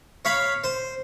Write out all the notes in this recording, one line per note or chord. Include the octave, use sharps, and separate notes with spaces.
C#5 F5 B5
C5